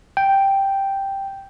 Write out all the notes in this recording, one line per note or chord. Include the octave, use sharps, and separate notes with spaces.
G5